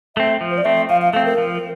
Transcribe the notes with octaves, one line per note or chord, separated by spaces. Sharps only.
A3 C4 E5
F3
C5
D5
A3 C4 E5
F3 F5
F5
A3 C4 F5
A#4
F3